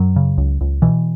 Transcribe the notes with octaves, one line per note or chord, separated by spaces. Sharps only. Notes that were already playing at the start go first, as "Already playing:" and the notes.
Already playing: F#2 F#3
C#3
C#2
C#2
B2 E3